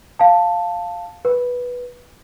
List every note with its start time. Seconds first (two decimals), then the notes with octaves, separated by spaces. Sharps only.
0.19 F5 A5
1.25 B4